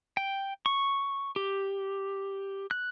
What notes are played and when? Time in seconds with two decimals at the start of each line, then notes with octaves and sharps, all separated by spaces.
0.17 G5
0.66 C#6
1.36 G4
2.71 F#6